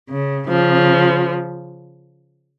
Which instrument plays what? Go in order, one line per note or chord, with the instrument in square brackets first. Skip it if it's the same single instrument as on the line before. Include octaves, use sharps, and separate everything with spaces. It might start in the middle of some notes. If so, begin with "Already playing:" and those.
[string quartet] C#3
C#3 F3